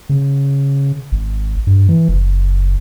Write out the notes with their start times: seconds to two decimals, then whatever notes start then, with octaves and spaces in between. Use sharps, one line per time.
0.09 C#3
1.12 G#1
1.67 G2
1.89 E3
2.08 F#1